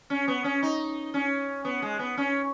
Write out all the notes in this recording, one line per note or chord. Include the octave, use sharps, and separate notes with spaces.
C#4
B3
C#4
D#4
C#4
B3
G#3
B3
C#4